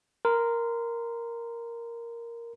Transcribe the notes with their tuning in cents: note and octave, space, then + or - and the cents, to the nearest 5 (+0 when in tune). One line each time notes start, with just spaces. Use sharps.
A#4 +0 C6 -30